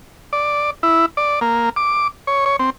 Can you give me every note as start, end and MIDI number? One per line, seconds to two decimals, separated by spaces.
0.33 0.70 74
0.83 1.06 64
1.17 1.40 74
1.41 1.69 58
1.76 2.08 86
2.27 2.45 73
2.46 2.56 73
2.59 2.70 60